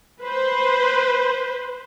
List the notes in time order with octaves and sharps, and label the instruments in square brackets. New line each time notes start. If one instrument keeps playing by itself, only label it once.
[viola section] B4 C5